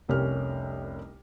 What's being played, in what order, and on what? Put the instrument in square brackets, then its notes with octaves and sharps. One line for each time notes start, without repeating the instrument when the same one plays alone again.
[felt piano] F1 C2 C#4 G4 A#4 F6